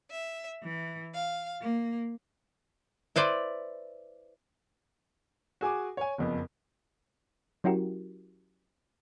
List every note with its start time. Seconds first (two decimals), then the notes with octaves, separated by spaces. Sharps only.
0.11 E5
0.63 E3
1.14 F5
1.61 A#3
3.16 E4 B4 C5 D5
5.61 F#4 G#4 G#5 D6
5.97 C#5 G#5
6.18 F#1 F2 B3
7.64 F#3 C#4 E4 F#4 G4 A#4